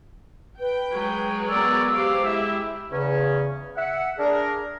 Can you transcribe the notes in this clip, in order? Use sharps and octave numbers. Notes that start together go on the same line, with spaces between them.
B4 G5
F#3 G#3
B3 A#4 D5 E6
G4 C5 F5 D6
G#3 E4 G4 E5
E2 C#3 C#4
E5 F#5
D4 G#4 A#4